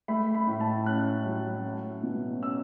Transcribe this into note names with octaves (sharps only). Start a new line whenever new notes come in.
A3 B5
B5
A2
A5
C#4 F#6
F#3
A3
B2
C#4 E6